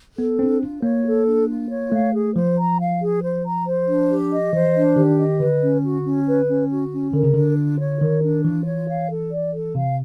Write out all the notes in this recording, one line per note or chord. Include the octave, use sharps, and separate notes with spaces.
B3 A4
C4 D4
F4
A#3 C#5
A4
D4
F4
C#5
A3 F5
G#4
F3 C5
A#5
F5
G#4
C5
A#5
C5
D4
G4
D#5
E3 C5
D4
D#3 G4
D#5
D3 B4
C#4
F#4
C#4
B4
C#4
F#4
C#4
D3 A#4
C#3
D3 D4
F4
C#5
D#3 A#4
D4
E3 F4
C#5
F5
A4
D5
A4
C3 F5